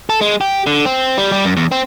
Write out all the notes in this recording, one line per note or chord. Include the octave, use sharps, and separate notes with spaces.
A4
G#3
G4
D3
C4
G3
G3
F#2
E2
C4